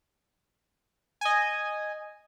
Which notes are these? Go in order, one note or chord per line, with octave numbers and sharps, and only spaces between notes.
D#5 G#5